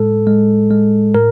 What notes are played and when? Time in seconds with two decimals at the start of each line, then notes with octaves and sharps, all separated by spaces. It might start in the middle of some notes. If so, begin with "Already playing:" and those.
Already playing: A2 G#3 A4
0.27 G#3
0.71 G#3
1.15 A2 A#4